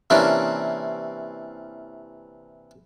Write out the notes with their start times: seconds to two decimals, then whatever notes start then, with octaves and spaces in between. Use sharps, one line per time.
0.10 C3 E3 A#3 C#4 D4